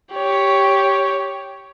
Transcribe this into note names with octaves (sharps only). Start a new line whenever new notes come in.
G4 C#5